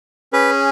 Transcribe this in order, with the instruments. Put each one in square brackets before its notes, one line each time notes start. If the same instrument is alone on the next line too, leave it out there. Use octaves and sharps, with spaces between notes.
[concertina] C#4 G#4 B4